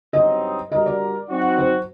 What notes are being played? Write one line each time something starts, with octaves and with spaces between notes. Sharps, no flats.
G2 F#3 C4 D#4 D#5
G3 D4 F#4 A#4 D#5
D5
F#3 C4 D#4 F#4
C5